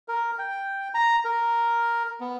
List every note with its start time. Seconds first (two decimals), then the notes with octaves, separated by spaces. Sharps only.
0.08 A#4
0.38 G5
0.94 A#5
1.25 A#4
2.20 B3